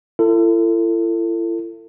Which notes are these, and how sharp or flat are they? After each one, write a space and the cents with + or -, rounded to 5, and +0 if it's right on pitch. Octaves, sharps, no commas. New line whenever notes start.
E4 +40 A4 +30